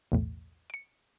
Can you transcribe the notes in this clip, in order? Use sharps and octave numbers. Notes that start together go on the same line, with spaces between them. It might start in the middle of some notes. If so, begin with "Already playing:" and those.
B1 E2 A2
C#7 D7